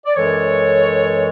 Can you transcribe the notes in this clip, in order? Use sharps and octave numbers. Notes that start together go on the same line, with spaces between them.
D5
F#2 E3 G#3 A4 C#5